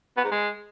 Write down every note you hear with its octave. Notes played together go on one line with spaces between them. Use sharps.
B3
G#2
G#3